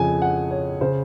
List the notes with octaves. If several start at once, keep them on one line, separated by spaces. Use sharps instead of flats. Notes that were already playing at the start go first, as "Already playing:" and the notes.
Already playing: F2 C#3 G#5
F#5
C#5
C#3 C5